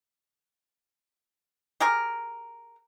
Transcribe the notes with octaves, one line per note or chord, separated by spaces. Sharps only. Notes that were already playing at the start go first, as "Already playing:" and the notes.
G4 G#4 A#4